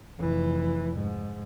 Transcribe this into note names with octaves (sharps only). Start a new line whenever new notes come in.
F1 E3
G#2